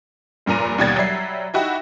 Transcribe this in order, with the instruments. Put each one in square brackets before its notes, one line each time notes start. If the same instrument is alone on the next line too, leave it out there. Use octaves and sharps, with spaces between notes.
[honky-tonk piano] F1 G2 A#2 A#5 D#7
D#2 B2 G3 G#6 A6
F#3 G3 E5 C7
D#4 E4 F#4 G4